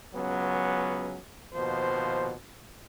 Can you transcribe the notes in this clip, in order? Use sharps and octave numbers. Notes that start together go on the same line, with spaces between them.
C#2 F#3 B3 C#4
D#2 B2 F3 C5